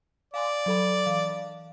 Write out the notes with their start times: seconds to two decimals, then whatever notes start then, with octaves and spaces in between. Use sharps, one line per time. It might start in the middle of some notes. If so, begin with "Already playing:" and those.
0.34 D5 F5 G#5 C6
0.66 F#3 A4 B5
1.06 E3 F5